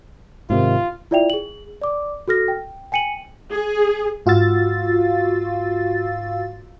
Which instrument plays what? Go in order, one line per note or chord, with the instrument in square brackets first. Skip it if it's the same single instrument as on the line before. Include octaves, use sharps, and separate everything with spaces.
[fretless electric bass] G#2 C3 D#3 [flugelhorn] F4
[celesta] E4 F4 D5 E5 G5 F7
G#4 F#7
D5 D6
F#4 A4 F6 A#6
G5
G5 G#5 C#7 D#7 F#7
[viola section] G#4
[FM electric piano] G#2 F4 F#4 F5 E6 A6